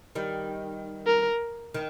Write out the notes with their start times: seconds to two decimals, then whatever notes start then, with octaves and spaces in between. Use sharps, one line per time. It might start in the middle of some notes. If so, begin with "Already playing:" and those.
0.15 D#3 G3
1.06 A#4
1.74 D#3